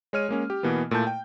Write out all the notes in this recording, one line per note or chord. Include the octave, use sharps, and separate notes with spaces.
G#3 C#5 F6 D#7
G#3 A#3 C#4
G4
B2 E3 A#3 B3
A#2 A3 E4 A5 G6
G5